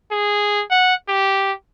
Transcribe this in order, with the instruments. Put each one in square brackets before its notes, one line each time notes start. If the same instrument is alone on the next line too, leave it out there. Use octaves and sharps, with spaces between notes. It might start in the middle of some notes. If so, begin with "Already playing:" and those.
[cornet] G#4
F#5
G4